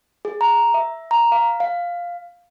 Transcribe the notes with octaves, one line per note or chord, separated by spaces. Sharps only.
G#4
A#5
E5
A#5
F5
F5